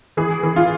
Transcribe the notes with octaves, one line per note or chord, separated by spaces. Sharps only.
E3 G#4
E3
F4